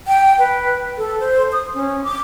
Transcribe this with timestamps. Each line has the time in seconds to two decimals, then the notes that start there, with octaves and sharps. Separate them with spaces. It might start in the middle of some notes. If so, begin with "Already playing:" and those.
0.07 G5
0.39 B4
0.98 A4
1.19 C5
1.52 D#6
1.74 C#4
2.04 D6